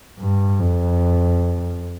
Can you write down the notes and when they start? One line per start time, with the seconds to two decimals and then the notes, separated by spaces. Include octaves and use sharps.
0.20 G2
0.60 F2